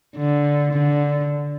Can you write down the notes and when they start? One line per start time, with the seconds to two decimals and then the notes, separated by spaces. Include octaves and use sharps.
0.16 D3
0.73 D3